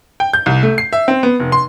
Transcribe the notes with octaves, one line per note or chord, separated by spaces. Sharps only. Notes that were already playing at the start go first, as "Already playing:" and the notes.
G5
G6
C2
A3
C7
E5
C4
B3
F1
C6